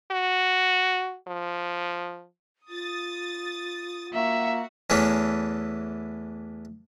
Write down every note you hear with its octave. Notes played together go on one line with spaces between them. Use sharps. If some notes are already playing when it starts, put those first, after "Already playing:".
F#4
F3
F4 D#6 A6
A#3 F#4 E5
E2 E3 A3 C#4 D4